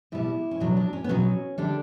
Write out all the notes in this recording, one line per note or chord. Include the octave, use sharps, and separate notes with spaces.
B2 G3 E4
C#4
B2 F#3 D4
D4
C#4
B3
B2 F#3 C#4
D3 G3 D4